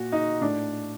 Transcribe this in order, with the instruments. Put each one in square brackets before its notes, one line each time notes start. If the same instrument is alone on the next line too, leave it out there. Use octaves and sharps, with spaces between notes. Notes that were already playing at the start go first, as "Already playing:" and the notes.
Already playing: [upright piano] A#2 F#4
D#4
A2 D4